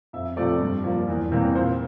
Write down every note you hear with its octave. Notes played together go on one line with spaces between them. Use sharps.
F2 E5
C3 F3 A3 D5
G2
F3 A#3
E2
C3 E3 G3 A#3
A#2 C5